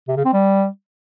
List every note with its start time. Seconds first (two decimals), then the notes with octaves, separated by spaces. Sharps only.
0.08 C3
0.16 C#3
0.25 C4
0.33 G3